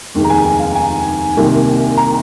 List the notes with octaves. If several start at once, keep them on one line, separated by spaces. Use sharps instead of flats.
F1 D#2 D#3 G#3
A#5
G#5
G#5
F5
G#5
C2 C3 D#3 A#3
A#5